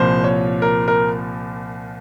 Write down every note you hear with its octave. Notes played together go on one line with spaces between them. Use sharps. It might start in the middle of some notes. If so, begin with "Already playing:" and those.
Already playing: C2 A#2 F3 C5
C#5
A#4
A#4